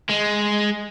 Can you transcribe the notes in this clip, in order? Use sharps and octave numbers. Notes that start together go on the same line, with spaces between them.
G#3